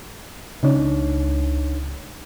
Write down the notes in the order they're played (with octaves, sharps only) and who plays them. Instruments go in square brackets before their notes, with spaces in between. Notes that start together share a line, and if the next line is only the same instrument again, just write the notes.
[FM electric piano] C#2 [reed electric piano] D4 D#4 C#5